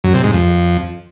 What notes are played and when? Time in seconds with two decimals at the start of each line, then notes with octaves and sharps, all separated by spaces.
0.04 F#2
0.14 C3
0.24 G#2
0.33 F2